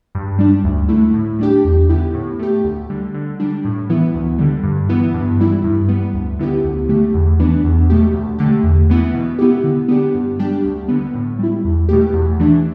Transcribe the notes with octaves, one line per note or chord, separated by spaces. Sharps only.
G2
G3 D4
D2
D3 A3 E4
A2
G3 D4 G4
E2
D3 B3 E4 G4
A2
A3 G4
D2
D3 G3
D3
G3 D4
A2
E3 B3 E4
D2
D3 G3
G2
E3 B3 E4
G2
E3 G3 E4
G2
G3 B3
D2
D3 B3 E4 G4
D2
D3 A3 G4
E2
E3 B3 D4
E2
B2 A3 G4
D2
D3 A3 G4
E2
E3 B3 E4
B2
B3 E4 G4
D3
B3 D4 G4
G2
G3 D4 G4
D2
D3 G3 B3
A2
G3 E4
E2
B2 A3 G4
E2
E3 A3 D4